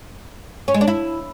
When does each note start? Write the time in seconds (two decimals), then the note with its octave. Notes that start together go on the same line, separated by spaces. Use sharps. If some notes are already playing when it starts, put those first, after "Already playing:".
0.68 C#4
0.74 G#3
0.81 D4
0.88 E4